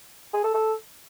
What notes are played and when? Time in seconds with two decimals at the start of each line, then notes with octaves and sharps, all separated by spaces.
0.33 G#4
0.44 A4
0.54 A4